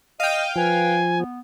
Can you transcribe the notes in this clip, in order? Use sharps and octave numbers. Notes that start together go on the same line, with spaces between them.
D#5 F5 G5 D#7
F3 B4 G#5
B3